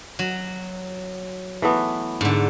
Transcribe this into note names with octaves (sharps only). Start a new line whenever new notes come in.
F#3
E3 A3 B3
G#2 D3